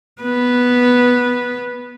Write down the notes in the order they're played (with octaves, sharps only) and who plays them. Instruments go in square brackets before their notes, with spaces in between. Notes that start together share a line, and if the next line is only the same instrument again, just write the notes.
[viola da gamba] B3 B4